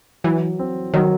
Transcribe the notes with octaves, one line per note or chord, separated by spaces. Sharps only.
E3 F#3
C4
D#3 F#3